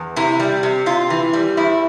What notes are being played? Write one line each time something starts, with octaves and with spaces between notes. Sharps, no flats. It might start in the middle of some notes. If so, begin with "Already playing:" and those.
Already playing: E2
C3 E4
G3
C3
C3 F4
E3
G3
E2 E4